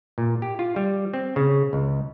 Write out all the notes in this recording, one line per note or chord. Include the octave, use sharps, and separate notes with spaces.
A#2
G4
F4
G3
C4
C#3
C#2